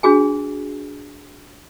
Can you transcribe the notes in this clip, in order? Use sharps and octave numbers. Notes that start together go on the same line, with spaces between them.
D4 F#4 G#4 G#5